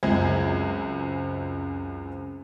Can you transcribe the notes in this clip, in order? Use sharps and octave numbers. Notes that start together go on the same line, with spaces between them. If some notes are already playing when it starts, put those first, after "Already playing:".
C#2 F#2 G#3 C4 G#6